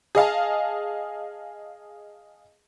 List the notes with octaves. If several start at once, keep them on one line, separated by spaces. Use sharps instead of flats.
G#4 D#5 F5 A5